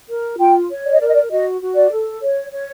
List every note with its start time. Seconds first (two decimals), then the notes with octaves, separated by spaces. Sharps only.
0.08 A#4
0.39 F4 G5
0.70 C#5
0.85 D5
0.91 D#5
1.00 A#4 D5
1.07 D#5
1.14 D5
1.30 F#4 D#5
1.61 F#4
1.75 D5
1.90 A4
2.22 C#5
2.52 C#5